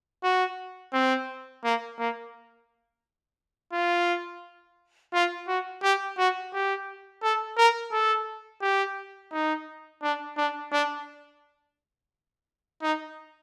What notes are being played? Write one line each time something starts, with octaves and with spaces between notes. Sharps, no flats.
F#4
C4
A#3
A#3
F4
F4
F#4
G4
F#4
G4
A4
A#4
A4
G4
D#4
D4
D4
D4
D#4